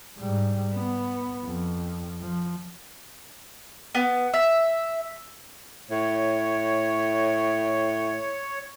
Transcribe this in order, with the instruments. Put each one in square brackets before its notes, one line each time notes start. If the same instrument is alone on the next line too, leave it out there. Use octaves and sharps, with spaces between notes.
[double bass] G#2 G3
B3
F2
F3
[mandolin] B3
E5
[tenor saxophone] A2 [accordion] C#5